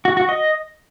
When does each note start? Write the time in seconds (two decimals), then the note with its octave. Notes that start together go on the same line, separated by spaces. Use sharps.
0.05 F#4
0.17 F#4
0.29 D#5